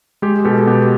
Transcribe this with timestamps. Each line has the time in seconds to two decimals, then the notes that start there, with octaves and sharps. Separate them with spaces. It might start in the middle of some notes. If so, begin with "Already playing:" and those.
0.22 G#3 G4
0.45 B2 G4 A4
0.67 B3 G4